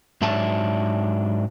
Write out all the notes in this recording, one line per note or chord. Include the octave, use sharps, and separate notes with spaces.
G#2 F#3 D4 E5 A5